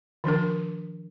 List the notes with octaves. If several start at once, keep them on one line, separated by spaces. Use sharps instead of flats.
D#3 F3 D4 A#4